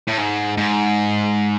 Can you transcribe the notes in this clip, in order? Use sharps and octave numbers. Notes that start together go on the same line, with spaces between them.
A2
G#2
G#2